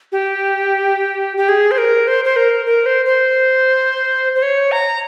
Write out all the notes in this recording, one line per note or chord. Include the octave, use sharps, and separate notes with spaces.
G4
G4
G#4
C5
A#4
C5
C5
A#4
A#4
C5
C5
C5
C#5
A#5